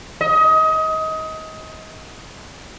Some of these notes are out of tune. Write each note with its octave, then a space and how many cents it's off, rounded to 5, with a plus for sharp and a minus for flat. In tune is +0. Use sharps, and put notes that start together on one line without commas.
D#5 +25